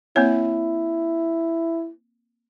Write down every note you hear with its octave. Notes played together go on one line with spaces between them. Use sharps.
A#3 C4 E4 C#5